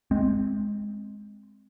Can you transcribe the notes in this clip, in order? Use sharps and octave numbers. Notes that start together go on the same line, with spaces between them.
G#3 C4